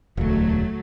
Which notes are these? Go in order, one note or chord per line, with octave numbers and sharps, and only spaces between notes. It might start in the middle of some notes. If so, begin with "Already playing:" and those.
E1 D2 F#3 A3